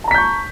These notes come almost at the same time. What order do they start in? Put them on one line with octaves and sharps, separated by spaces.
A5 A#5 B6 G6 C#6